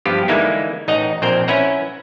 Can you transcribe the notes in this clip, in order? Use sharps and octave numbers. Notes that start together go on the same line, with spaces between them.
G2 F3 B3 F4 G4
D3 E3 G#3 A#3 D#4 E4
A1 D#4 D#5 F#5 A#5
A#1 A#2 C4 A#4 C5 G5
C#4 E4 B4 E5 F#5 A#5